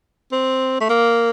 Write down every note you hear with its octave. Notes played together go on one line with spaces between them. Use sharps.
C4
A3
A#3